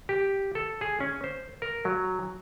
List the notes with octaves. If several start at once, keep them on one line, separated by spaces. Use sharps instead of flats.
G4
A4
G#4
C#4
C5
A#4
F#3